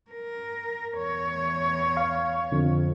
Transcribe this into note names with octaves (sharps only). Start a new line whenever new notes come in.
A#4
E2 C#5
F5 C#6
F2 D3